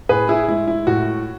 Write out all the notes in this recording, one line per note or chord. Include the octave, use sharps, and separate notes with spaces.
A2 G#4 B4
E4 G#4
G#3 E4
E4
A2 F#4